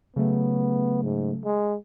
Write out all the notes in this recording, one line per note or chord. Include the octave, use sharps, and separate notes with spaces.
C#3 F#3 A3 B3
G#2
G#3